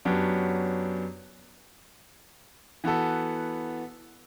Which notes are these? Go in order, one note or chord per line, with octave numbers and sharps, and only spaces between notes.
F#2 F#3 B3 D4 G4
E3 B3 F#4 A4